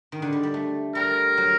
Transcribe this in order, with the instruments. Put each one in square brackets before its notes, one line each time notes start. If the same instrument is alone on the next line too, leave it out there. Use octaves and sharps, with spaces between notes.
[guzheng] D#3
D3
G3
G3
A3
[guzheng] G3 [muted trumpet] A#4
[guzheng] F#3